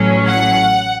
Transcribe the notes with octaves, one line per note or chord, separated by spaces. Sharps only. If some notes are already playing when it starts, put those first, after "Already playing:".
Already playing: A1 A2 F#3 C#4
F#5